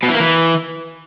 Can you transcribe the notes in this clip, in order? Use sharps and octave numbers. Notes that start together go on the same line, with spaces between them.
B2
E3
A#3
E3